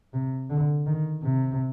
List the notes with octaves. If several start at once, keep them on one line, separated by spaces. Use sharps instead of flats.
C3
D3
D#3
C3